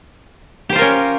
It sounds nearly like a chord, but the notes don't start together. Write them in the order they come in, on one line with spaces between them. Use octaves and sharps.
G4 C5 F4 A#4 C#4